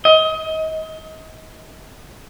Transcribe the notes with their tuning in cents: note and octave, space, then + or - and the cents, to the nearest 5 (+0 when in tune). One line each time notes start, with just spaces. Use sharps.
D#5 +30